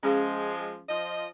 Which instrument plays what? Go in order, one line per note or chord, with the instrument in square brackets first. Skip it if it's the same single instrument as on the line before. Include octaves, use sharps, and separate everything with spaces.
[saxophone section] F3 G#3 [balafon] C#4 G#4 F5
[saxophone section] F3 D#5